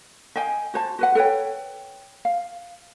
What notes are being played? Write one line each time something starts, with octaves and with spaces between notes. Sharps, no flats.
D#5 F5 G5 G#5
F#4 C5 A5
F#4 B4 F#5
A4 B4 C#5 G5
F5